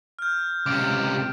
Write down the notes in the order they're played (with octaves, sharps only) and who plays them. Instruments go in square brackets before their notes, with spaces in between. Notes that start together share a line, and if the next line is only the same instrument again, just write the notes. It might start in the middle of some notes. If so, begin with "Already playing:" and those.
[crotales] F6 G6
[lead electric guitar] C#2 C3 [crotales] D6 D7